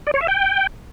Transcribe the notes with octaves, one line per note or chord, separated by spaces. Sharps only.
D5
C#5
E5
G5